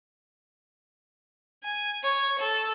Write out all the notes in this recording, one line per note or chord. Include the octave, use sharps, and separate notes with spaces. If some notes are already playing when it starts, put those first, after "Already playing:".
G#5
C#5
A4